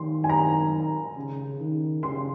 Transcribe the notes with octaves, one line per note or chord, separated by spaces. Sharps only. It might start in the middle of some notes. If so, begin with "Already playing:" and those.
Already playing: D#3 C6
G#5
A#5
C#3
D#3
C#3 C6